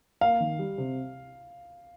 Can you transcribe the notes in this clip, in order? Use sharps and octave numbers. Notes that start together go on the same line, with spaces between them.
A#3 F5
D#3
G3
C3